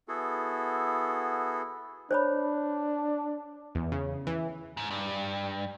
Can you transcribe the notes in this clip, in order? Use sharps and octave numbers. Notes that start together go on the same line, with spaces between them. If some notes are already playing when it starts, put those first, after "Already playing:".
B3 E4 F#4 G#4 A4
D4 C5 C#5 B5
E2
C#3
E3
G#2
G2